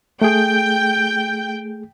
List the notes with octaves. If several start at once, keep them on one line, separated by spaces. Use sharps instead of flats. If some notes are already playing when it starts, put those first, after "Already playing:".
A3 G#4 G5